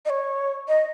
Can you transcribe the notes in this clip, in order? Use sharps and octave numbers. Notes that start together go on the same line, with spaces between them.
D#5
C#5
D#5